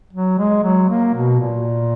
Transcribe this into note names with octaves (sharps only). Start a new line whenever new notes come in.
F#3
G#3
F#3
A#3
B2
A#2